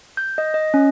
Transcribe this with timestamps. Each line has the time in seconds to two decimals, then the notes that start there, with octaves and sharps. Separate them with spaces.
0.17 G6
0.38 D#5
0.54 D#5
0.74 C#4